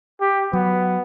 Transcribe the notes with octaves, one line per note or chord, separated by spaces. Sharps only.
G4
F#3 B3